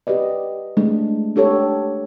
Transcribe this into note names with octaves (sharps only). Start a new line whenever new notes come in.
G4 B4 D5 D#5
G#3 A3 D4
D4 G4 A4 C#5